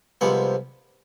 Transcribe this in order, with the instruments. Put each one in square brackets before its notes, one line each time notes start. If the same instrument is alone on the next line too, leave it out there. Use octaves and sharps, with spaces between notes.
[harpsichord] C2 C3 F3 G#3 B3 F#5